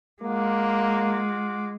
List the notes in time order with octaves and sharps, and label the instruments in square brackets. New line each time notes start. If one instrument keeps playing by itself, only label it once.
[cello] G#3 [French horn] A#3 [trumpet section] F4 F#5 D6